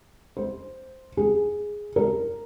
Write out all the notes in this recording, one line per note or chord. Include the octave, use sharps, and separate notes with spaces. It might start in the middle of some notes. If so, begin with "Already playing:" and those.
C5
G#4
A#4